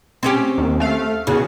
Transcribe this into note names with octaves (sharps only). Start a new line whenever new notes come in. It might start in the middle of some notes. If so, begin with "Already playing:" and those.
C4 C#4 G4
D#2
A3 F5
E2 C#3 F#4